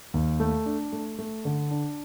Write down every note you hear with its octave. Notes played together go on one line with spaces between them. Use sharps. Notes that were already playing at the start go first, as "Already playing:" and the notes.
D#2
A3
D4
A3
A3
D3
D4